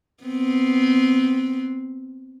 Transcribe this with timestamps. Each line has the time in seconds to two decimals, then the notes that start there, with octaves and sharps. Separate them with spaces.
0.24 B3 C4